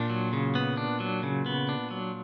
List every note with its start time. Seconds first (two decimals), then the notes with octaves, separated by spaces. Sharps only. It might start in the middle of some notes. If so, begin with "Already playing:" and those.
Already playing: A#2 D4
0.10 F#3
0.33 C#3
0.55 B3
0.77 D4
1.00 F#3
1.23 C#3
1.46 B3
1.69 D4
1.91 F#3